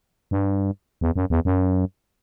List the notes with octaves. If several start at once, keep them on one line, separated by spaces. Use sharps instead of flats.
G2
E2
F#2
E2
F#2